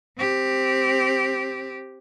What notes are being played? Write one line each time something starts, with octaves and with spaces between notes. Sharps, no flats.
C4 G4